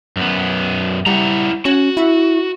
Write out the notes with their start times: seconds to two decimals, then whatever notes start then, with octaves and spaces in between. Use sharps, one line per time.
0.17 F#2 B3
1.06 G3 E4 F#5 A#5
1.65 C#4 F#4
1.97 E4